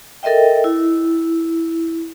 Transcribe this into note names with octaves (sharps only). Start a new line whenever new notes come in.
A4 A#4 D#5 E5 G5
E4